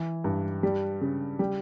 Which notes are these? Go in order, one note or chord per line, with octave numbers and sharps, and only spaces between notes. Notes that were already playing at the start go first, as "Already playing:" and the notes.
Already playing: E3
G2
G3
C#3
G3